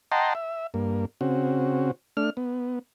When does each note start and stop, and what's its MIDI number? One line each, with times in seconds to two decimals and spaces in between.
0.12 0.33 75
0.12 0.33 78
0.12 0.33 79
0.12 0.33 81
0.12 0.33 82
0.12 0.33 84
0.35 0.67 76
0.74 1.05 43
0.74 1.05 58
1.21 1.91 49
1.21 1.91 60
1.21 1.91 66
2.17 2.30 57
2.17 2.30 62
2.17 2.30 89
2.37 2.79 59